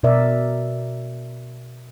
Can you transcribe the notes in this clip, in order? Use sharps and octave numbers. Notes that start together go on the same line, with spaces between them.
B2 A#4 D5 E5